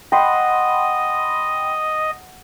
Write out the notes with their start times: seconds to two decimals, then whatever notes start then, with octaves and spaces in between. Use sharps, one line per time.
0.12 D#5 F#5 G5 B5 C6